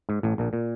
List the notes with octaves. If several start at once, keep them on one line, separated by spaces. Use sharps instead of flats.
G#2
A1 A2
A#1 A#2
A#2